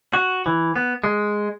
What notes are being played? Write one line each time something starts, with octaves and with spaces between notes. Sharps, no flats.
F#4
E3
B3
G#3